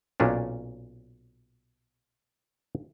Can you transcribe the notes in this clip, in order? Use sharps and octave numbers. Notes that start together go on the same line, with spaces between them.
B1 A#2 C#4 D4